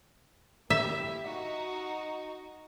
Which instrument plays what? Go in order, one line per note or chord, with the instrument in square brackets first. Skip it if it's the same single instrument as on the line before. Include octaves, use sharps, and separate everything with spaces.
[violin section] A#3 E4 G4 [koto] E5
[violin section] D#4 F#4